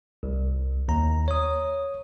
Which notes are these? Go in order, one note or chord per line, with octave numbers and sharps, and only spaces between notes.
C2
D#2 A#5
C#5 D#6